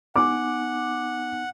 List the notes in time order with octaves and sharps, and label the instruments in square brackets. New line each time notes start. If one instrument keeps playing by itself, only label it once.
[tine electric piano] B3 D#4 G#5 [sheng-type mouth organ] F#5 [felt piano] D6